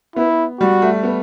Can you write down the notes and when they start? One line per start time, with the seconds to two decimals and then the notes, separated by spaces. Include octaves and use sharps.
0.16 B3 E4
0.60 G3 F#4
0.82 A3
1.03 B3